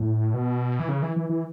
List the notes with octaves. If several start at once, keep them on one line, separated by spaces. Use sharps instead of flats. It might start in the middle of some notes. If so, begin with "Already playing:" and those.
Already playing: A2
B2
E3
C#3
E3
E3
E3